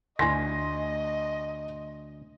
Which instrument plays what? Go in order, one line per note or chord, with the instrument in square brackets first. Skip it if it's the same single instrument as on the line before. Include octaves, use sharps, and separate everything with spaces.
[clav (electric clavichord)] D2 [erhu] D#5 [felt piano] G#5 C6 A#6